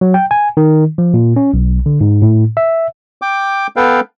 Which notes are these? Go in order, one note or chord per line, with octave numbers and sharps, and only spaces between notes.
F#3
G5
G#5
D#3
F3
A#2
C#4
B1
D3
G#2
A2
E5
G5 D6
B3 A4 B4 F5 G5